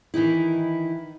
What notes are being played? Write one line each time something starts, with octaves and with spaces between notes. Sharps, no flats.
D#3 E3 D#4 E4